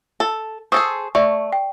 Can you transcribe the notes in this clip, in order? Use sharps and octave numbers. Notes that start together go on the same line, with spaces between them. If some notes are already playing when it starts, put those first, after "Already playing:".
A4
G#4 A4 C5 C#6 D#6 E6
A3 D5 C#6
G5